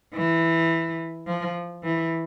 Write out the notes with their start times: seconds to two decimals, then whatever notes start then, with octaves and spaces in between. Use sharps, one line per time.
0.14 E3
1.27 F3
1.84 E3